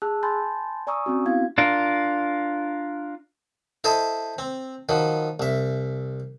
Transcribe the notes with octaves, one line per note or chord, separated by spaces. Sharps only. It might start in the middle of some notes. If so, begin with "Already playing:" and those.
G#4 A5 E6 F#6
G#5 A5 B5 C6 G6 A6
D5 G#5 A#5 C#6 D#6 E6
C4 C#4 F#4
B3 C4 E4 F5 G#6
D4 F4 A#4
E4 A4 C5 D#5
C4
D#3 F3 F#3
C2 E5